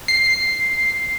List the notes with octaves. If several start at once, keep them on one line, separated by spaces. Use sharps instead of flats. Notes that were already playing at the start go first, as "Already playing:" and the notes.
C7